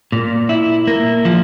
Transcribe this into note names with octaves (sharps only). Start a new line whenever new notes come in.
A#2
E4
A#3
F3